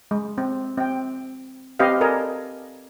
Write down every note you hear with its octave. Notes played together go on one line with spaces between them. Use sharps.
G#3
C4
C4 G5
C4 G4 B4 D#5 F5
A4 A#4 D5 D#5 G#5 A5